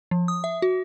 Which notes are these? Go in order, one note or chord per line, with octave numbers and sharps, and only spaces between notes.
F3
D#6
E5
F#4